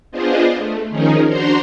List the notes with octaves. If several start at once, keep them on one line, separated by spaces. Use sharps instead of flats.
B3 D4 F4 G#4 C5 D#5
A3
D#3 F3 C#4 D#4 G#4 A#4
D4 F#4 C5 A#5 C6